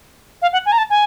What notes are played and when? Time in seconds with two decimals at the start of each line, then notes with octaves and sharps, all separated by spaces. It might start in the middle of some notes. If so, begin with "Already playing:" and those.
0.42 F5
0.53 F#5
0.66 G#5
0.72 A#5
0.78 A5
0.90 G#5